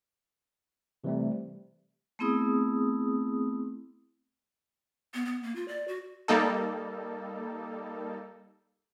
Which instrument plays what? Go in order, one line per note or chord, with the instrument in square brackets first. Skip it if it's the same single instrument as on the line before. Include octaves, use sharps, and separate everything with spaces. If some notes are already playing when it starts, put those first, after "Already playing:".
[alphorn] C3 [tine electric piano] E3 G3 A3
[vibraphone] A3 B3 C4 E4 G#4 D#6
[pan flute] B3
B3
A#3
F4
D5
F#4
[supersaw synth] G3 A#3 D#4 A4